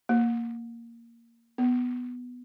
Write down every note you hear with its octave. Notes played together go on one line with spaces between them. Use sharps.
A#3
B3